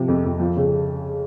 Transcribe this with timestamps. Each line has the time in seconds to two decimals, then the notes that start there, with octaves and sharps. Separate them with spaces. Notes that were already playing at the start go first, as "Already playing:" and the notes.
Already playing: C3 F3
0.08 F2
0.24 F2
0.40 F3
0.57 C#3